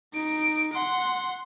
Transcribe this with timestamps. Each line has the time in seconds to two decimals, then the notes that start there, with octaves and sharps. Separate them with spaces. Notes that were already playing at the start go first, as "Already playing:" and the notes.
0.14 D#4 D7
0.73 F#5 C6